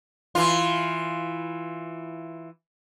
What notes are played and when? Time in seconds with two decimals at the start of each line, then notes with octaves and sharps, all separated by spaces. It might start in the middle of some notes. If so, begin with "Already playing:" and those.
0.35 E3 F4